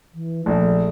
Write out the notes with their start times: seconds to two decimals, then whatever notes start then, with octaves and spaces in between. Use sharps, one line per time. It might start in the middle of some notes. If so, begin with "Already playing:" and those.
0.14 E3
0.46 A#1 A3